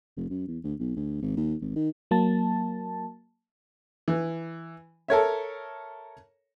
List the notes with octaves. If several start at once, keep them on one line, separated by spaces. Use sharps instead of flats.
F1
F#2
E2
D2
B1
D2
G#1
D#2
G#1
D#3
F#3 A#3 A5
E3
A4 A#4 C#5 E5